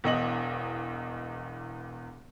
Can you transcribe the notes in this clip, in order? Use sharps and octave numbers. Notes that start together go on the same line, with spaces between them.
E1 E2 D#5 F#7